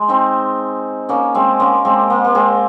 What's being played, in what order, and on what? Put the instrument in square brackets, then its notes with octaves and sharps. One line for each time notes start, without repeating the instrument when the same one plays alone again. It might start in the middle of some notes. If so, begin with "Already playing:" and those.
Already playing: [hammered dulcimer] G#3
C4 D#4
A#3 C#4
G#3 C4
A#3 C#4
G#3 C4
A#3
A#3
G#3 C4